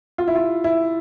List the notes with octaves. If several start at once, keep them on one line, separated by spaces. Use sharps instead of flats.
F4
E4
F4
E4